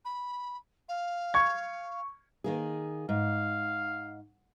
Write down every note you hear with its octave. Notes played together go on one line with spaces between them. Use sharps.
B5
F5
C#6 G#6
D#3 A#3 G#4
G#2 F5